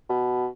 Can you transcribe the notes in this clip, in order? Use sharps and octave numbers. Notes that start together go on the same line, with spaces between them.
B2